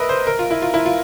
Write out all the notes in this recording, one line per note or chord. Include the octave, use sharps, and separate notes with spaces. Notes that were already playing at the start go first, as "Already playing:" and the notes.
Already playing: A#4 B4 D#5 E5
C5
A#4
F4
E4
F4
E4
F4